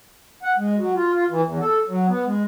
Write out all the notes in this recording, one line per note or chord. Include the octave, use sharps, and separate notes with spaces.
F#5
G#3
F#3
F4
F4
E3
E2
A4
F#3
B3
G#3